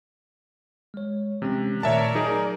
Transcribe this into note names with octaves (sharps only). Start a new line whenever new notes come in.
G#3 C#5
C3 E3 G#3 C#4
A#2 D#3 A3 A#4 C#5 D5 E5 A5
F#3 D#4 G#4